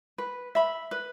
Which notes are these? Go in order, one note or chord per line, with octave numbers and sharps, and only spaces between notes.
B4
E5 B5
B4